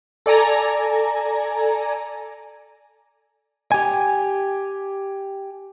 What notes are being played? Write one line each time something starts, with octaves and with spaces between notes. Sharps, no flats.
A4 D5 G#5 A#5
G4 G#5